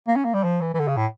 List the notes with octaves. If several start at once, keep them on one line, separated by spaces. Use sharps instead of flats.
A#3
C#4
A#3
G3
F3
E3
E3
D3
C#3
A2